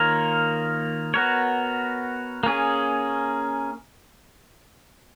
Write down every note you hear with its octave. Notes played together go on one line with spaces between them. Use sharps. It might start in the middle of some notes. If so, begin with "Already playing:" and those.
Already playing: D#3 A#3 F4 A#4 C#5
B3 F#4 A#4 C#5
A#3 C#4 G#4